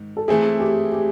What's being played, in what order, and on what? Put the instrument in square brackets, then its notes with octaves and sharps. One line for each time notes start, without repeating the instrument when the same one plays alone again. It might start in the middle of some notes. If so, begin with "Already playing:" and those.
Already playing: [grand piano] G#2 D#3
[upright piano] A4
[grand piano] E3 A3 C4 E4 [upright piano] G#4
[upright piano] G4
G4